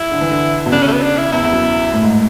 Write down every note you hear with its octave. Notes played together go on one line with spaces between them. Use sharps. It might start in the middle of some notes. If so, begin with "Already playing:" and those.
Already playing: E4
D3
E3
D3
B2
C#3 D4
C#4
A3
B3
D4
E4
E2 E4
E2
F#2
A2
G#2